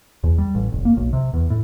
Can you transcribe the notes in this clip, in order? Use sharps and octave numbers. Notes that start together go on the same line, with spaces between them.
E2
G3
A1
F1
A#3
B1
C3
E2
A2